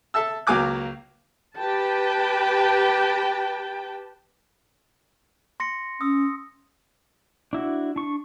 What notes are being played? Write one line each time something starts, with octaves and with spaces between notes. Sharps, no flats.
A4 E5 A5 E6
C#2 F#3 A#3 G#5 D6 F#6
G4 B4 G5 A5
C6 A#6 C#7
C#4 D#6 E6
D4 E4 F#4
D4 C#6